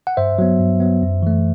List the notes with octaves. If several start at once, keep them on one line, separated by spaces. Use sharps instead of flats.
F#5
G2 C5 E5
F#3 B3
G2
F#3 B3
F#2
E3 A3